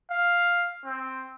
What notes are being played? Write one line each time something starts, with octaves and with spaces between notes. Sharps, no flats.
F5
C4